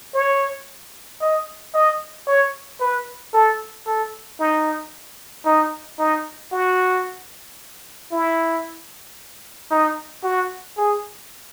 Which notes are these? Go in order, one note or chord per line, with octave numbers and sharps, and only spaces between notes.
C#5
D#5
D#5
C#5
B4
A4
A4
D#4
D#4
D#4
F#4
E4
D#4
F#4
G#4